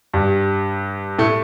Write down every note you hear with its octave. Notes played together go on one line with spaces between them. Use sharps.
G2 G3
A2 A3